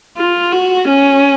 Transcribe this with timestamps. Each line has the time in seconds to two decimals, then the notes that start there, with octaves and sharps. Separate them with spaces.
0.17 F4
0.52 F#4
0.88 C#4